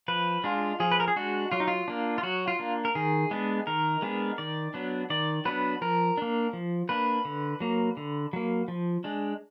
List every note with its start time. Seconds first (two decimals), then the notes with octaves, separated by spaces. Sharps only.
0.08 F3 B4
0.44 G#3 D4 F4
0.80 F3 G#4
0.92 B4
1.00 A#4
1.08 G#4
1.16 G#3 D4 F#4
1.52 F#3 F4
1.60 D#4
1.68 F4
1.88 A#3 D4
2.18 F4
2.23 F#3 F#4
2.48 F4
2.59 A#3 D4
2.85 A#4
2.95 D#3 G#4
3.31 G#3 B3 D4
3.67 D#3 A#4
4.02 G#3 B3 D4
4.38 D#3 D5
4.74 F#3 B3 D4
5.10 D#3 D5
5.45 F#3 B3 D4 B4
5.82 F3 A#4
6.18 A#3 D4
6.53 F3
6.89 A#3 D4 B4
7.25 D3
7.60 F#3 A#3
7.97 D3
8.33 F#3 A#3
8.68 F3
9.04 G#3 D4